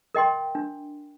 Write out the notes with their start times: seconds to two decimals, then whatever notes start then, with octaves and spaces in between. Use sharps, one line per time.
0.15 A#4 D#5 G5 C6
0.55 D4